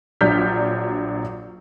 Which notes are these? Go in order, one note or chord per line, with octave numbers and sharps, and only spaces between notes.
A#1 F#3 D4 F6 G6 B6